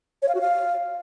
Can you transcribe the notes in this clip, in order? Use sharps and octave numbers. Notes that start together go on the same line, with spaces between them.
C#5
F5
F#4
F5